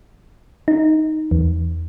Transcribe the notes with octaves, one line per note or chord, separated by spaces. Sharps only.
D#4
E2